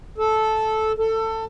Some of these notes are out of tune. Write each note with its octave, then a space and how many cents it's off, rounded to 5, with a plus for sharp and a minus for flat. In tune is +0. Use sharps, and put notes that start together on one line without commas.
A4 -10
A4 +20